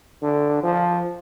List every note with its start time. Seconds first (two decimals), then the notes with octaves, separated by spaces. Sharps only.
0.23 D3
0.63 F3